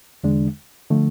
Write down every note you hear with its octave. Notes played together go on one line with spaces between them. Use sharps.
E2 D3 G#3 D4
D3 F3 A3